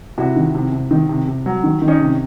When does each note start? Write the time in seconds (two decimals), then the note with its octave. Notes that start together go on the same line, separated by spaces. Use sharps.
0.18 C3 E4 F#4
0.36 D#3
0.55 C3
0.73 C3
0.91 D#3
1.09 C3
1.27 C3
1.46 F#3
1.64 D#3
1.82 D#3
1.88 C#4 D#4
2.00 C3